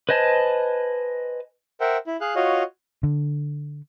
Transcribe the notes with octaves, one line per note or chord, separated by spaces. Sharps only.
B4 C5 D#5 G#5 A5
A#4 C5 E5 F#5 G5
E4
G#4 F5 F#6
F4 F#4 C#5 D#5 F5
D3